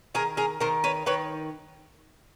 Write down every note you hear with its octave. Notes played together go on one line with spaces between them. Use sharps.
D#3 G#4 A#4
G#4 A#4
D#3 A#4 C5
B4 C#5
D#3 B4 C#5